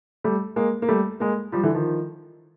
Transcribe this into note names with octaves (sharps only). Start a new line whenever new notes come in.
G3 A3
G#3 A#3
A#3
G3 A3
G#3 A#3
F3 G3
D3 E3
D#3 F3